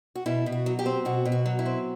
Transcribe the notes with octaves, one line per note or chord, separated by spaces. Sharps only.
F#4
B2 E4
B2
F#4
F#3
G4
C4
B2 F#4
B2
F#4
F#3
E4
C4